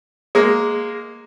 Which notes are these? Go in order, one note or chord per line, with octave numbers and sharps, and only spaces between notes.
G#3 A#3